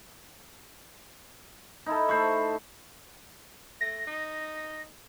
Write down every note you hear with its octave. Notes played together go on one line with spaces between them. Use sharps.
D#4 E4 A4
A3 C5 B5 C#6
A3 A#6
D#4